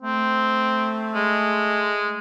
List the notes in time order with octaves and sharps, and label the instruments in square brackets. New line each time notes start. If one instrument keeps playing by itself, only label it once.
[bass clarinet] A3 [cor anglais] C4
[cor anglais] G#3